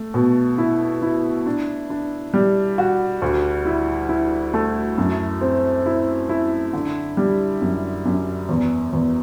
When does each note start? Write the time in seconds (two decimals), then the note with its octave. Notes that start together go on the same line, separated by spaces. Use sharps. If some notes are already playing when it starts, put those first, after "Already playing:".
Already playing: A3
0.14 B2
0.58 E4
1.02 E4
1.46 D4
1.90 D4
2.34 G3
2.78 F#4
3.22 D2
3.66 E4
4.09 E4
4.54 A3
4.98 F#2
5.41 C4
5.86 E4
6.29 E4
6.73 D3
7.17 G3
7.61 F#2
8.05 F#2
8.49 E2
8.93 E2